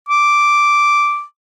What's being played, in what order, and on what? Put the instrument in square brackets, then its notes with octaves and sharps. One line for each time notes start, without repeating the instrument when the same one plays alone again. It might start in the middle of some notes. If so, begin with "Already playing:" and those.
[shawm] D6